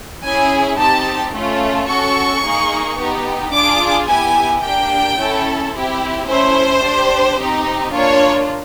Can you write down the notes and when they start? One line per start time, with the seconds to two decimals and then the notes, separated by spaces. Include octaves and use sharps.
0.24 C#4 E4 G#4 G#5
0.79 C4 D#4 G4 A5
1.33 A3 C#4 F4
1.88 C#4 F#4 A4 C#6
2.43 A#3 D#4 G#4
2.98 B3 D#4 G4
3.53 D4 F4 G#4 D6
4.08 B3 E4 G4 G#5
4.63 A#3 D4 G4 G5
5.18 C#4 E4 A4
5.73 C4 E4 G4
6.28 A3 C#4 E4 C5
6.83 D4 G4
7.38 C4 D#4 G4
7.92 A#3 D4 F4 C#5